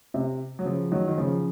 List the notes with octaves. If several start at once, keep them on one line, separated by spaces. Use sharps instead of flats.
C3
F#3
C#3 F3
D#3 F#3
D#3
C#3 F3